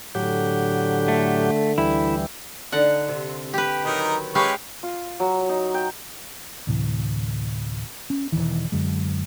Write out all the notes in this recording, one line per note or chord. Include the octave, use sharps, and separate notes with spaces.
A2 D3 F#3 G4
A3
D2 E3 G3 E4
D3 D4 D#4 F#5
C3
G4 B4
D#3 F#3 D#4 A#4
G#3 C#4 G4 B4 F5 C#6
F4
F#3
D#4
G5
D2 A2 C3 E3
C#4
E1 B1 D#3 E3
F#2 D3 G#3